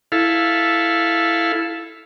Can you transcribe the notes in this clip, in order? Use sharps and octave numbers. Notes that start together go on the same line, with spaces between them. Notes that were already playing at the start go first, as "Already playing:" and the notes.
E4 A4 F5